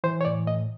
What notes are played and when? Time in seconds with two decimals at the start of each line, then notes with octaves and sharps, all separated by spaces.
0.04 E3 C5
0.21 C#5
0.25 A2 D5
0.47 A2 D#5